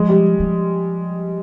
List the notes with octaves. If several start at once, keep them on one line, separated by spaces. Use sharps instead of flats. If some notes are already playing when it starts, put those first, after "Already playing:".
Already playing: F3 G#3
G3
F3